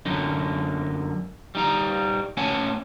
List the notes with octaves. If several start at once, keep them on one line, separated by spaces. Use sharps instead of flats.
F#2 D3 D#4
G3 D#4 A#5
A3 C#4 C#5 F#5 G#5 A5